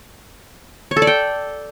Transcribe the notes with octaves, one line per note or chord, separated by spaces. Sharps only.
C#5
A4
D5
G5